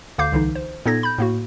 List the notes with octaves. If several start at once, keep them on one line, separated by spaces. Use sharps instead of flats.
D2 D3 F5 D6 G6 C7
C2 D3 E3 D#4
C5
A#2 B3 D#4 A4 G#6 A#6
B5 G6
A2 A#3 F#4